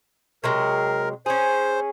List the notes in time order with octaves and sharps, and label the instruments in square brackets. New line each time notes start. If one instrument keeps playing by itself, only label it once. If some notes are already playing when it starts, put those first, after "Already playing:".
[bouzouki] C3 F#3 G#3 [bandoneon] A#4
[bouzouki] C#4 G#4 [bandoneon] C5